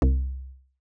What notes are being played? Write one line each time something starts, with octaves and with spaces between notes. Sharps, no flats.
C2